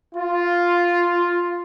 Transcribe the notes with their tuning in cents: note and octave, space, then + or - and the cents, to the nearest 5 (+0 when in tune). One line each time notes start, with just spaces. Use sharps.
F4 +0